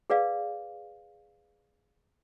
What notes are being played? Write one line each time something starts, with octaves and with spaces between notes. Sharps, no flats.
G#4 B4 D5 F5